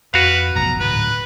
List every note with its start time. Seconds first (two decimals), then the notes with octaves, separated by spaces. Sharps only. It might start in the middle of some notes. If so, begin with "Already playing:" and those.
0.14 F2 F#4 B4 F5
0.55 F1 B1 F2 A#5
0.80 D1 G#2 D3 B4